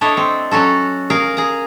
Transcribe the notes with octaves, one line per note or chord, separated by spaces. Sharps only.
D4 E4 A4 C#5 D#5
C4
F#3 C#4 F#4 A4
G#4 A#4 F5
G#4 A#5